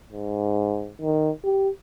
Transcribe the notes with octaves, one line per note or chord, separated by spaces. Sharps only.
G#2
D#3
G4